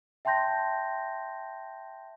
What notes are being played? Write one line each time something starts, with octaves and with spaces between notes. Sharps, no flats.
E5 G5 A5 C6 G6 A#6